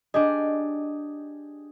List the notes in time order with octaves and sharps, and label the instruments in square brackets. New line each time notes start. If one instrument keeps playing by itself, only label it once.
[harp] D4 G4 G#4 [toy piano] D#5